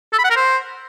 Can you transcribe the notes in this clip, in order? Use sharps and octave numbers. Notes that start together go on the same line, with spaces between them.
A4
B5
F#5
A#4
C5